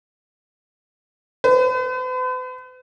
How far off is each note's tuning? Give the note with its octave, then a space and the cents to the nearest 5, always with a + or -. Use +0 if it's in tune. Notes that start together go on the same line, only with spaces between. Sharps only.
B4 +45